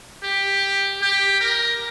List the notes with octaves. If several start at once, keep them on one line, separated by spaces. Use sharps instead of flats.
G4
G4
A#4